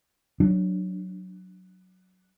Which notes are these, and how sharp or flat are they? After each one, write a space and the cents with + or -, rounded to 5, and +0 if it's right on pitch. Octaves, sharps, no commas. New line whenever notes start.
F#3 +0 D4 +15